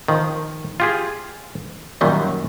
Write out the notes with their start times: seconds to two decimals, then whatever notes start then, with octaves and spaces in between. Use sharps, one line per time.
0.08 D#3 F3
0.80 F4 G4 G#4
2.01 F#2 A#2 D#3 F#3 G3